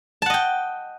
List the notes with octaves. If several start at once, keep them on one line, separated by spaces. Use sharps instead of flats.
D#5 F#5 G5 A5